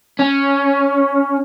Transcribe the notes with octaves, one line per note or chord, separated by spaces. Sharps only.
C#4